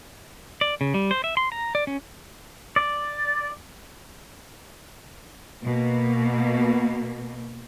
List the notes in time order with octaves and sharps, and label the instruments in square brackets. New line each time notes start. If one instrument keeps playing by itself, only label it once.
[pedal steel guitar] D5
C#3
G3
C5
E5
C6
A#5
D5
C#4
D5
[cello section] B2 A#3